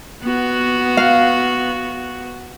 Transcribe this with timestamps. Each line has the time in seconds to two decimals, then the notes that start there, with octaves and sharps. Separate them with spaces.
0.23 B3 F#4
0.97 F5